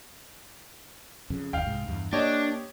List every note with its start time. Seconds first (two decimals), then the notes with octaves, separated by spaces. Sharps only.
1.30 F2 C#3
1.53 F#1 D#2 F5 G5
1.67 C2 G#2
1.88 E2 G2
2.13 A#3 D4 G4 C#5 D#5